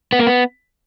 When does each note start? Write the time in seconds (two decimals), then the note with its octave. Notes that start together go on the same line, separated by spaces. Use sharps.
0.12 B3
0.19 A#3
0.27 B3